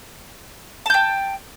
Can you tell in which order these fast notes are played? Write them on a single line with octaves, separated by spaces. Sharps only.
A5 G6 G5